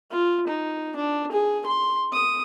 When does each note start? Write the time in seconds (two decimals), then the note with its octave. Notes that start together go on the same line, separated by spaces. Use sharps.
0.11 F4
0.47 D#4
0.96 D4
1.32 G#4
1.66 C6
2.13 D#6